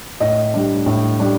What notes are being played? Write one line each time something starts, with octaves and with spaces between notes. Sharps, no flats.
A2 D#5
G3 D4
A2
G3 D4